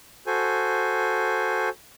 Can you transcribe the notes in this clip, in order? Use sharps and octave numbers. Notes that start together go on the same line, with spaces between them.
F#4 A4 C5 G#5